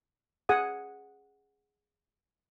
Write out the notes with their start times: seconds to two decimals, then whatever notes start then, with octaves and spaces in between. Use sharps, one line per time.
0.49 G#4 F#5 G#5 D#6